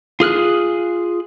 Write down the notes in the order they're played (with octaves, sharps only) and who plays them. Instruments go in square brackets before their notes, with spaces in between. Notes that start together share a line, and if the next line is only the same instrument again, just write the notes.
[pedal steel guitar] F4 G#4 F6 F#6